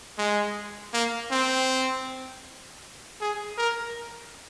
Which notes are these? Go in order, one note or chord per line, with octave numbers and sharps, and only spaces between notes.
G#3
A#3
C4
G#4
A#4